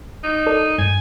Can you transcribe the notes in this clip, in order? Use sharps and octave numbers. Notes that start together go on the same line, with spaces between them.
D#4
A4 A#4 D5
G2 G#5